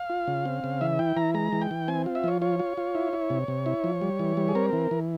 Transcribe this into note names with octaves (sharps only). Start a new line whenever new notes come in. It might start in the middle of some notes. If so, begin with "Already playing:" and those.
Already playing: F5
F4
C#3
C4
C#3
E3 E5
E4 G5
E3 A#5
G#3 A#5
E3
G5
E3
C4 G#5
F4
E5
F3 C#5
F4 C#5
F4
F4
E4
E4
C3
C3
E4
F3
G3
E3
G3
G#4
C4 A#4
E3
E3